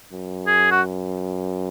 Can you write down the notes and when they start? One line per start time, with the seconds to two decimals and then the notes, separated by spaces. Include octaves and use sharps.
0.12 F#2
0.47 G#4
0.71 F#4